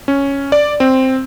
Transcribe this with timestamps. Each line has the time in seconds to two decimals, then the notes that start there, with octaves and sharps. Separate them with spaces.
0.08 C#4
0.52 D5
0.80 C4